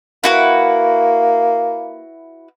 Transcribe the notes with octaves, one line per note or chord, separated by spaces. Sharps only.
A#3 E4 F#4 B4